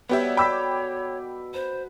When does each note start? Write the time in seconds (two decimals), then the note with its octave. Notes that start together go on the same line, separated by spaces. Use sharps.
0.09 B2 G3 B3 G4 C#5 E5
0.37 A4 G5 B5 D6 E6 B6
1.54 B4 C5